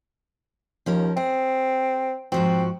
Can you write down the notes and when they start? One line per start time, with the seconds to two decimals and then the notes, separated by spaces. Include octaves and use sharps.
0.86 D#2 F3 C#4 A#4
1.17 C4 G#4
2.32 G#2 F3 C4 F#4